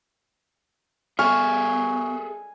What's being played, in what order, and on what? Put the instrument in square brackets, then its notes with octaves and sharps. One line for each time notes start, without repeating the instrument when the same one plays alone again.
[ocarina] B3 [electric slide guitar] G#4 A4 E5 [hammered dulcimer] G#5 [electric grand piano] C#6 F6